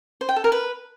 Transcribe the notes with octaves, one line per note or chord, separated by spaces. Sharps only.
C5
G5
A4
A#4
B4